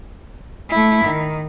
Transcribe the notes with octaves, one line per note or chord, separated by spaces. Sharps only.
A3 E4
D#3